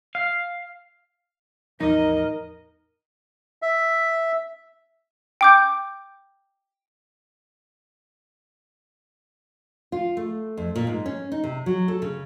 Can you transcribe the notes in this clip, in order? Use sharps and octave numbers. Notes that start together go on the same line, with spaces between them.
F5
A1 E2 F3 D#4 A#4 D#5
E5
G5 D6 G6
F4
A3
F2
A#2
G#2
C#4
D#4
C3
F#3
A4
C#3